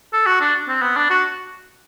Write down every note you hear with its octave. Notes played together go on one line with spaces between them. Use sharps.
A4
F#4
D4
C4
B3
D4
F#4